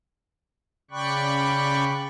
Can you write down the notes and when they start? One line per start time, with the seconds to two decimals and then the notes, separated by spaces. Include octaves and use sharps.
0.91 C#3 D5 G5 B5 C#6 F#6